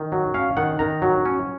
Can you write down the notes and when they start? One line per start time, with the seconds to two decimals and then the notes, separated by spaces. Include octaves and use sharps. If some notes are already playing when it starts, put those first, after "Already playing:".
Already playing: D#3
0.12 F#3
0.34 C#4 F5
0.57 D#3 F#5
0.79 D#3 A#5
1.02 F#3
1.25 C#4